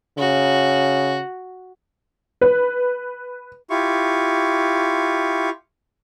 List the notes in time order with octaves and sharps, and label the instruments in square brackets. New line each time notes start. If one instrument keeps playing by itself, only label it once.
[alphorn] C#3 [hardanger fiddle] F#4
[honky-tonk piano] B4
[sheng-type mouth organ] E4 F4 G4 C#6